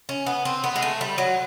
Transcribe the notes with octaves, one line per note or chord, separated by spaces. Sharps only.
C#4
B3
C4
B3
G#3
A3
G3
F#3